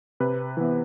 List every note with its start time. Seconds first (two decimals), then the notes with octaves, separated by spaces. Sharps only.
0.20 C3 B4
0.57 E3 B3